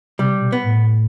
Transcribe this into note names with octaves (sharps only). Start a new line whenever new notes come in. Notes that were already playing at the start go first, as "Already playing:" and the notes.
C3 G3
B2
B3
A2